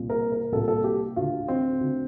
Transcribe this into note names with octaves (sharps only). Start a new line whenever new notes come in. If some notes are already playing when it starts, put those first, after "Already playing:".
Already playing: C2 A#2
A#4
A#4
C2 A#2 A4
A4
G4
D2 D3 F4
C4
D2 D3